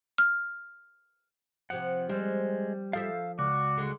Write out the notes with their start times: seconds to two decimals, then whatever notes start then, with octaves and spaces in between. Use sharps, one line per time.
0.18 F6
1.70 C3 F3 F#5
2.09 G3 G#3 C4
2.93 F3 A4 E5 F5 E6
3.39 C#2 F#4 D5
3.78 D3 G#3